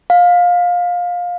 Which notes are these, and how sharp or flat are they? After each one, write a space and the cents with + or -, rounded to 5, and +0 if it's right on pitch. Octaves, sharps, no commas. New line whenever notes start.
F5 +20